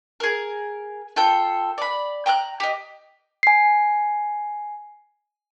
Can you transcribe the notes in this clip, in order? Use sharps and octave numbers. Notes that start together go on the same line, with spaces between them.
G#4 A#4
F4 A4 G5
D5 B5
G5 A#5 E6 F#6
G4 D#5
G#5 C7